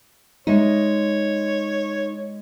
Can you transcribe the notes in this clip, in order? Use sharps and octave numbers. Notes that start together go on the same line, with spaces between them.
G#3 D#4 C#5 D#5 E5